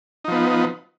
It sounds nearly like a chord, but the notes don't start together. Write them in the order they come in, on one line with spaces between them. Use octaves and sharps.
D#4 F3 B3